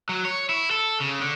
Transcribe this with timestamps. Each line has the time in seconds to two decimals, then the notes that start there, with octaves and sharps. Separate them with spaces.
0.09 F#3
0.25 C#5
0.49 E4
0.71 A4
1.00 C#3
1.20 D3